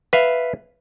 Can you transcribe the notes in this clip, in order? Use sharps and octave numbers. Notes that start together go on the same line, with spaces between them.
B4 E5 F5